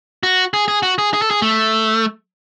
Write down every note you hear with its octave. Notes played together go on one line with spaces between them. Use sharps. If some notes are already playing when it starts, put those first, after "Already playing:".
F#4
G#4
G#4
F#4
G#4
G#4
A4
G#4
A3